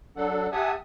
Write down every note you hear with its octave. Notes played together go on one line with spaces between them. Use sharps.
F#3 D4 A4 F#5
G4 E5 F#5 G#5 A5 D#6